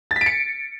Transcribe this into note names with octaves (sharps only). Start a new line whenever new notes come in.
A6
B6
D7
C#7